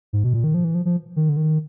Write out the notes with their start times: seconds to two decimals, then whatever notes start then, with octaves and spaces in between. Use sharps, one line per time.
0.13 G#2
0.24 B2
0.34 A#2
0.44 D#3
0.54 F3
0.64 E3
0.75 F3
0.85 F3
1.16 D#3
1.29 D3
1.37 D#3